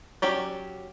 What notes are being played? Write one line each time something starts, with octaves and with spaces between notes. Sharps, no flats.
F#3 C#4 G4 D5